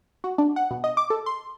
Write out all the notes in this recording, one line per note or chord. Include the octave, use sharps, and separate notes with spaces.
F#4
D4
F#5
B2
D#5
D6
A4
C6